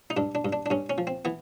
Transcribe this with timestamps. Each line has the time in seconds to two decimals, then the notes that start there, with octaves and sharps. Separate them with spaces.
0.10 D#4
0.17 G2 D4
0.35 D4
0.45 G2
0.53 D4
0.66 D4
0.70 G2 C#4
0.90 C#4
0.98 F3
1.07 C4
1.25 E3 B3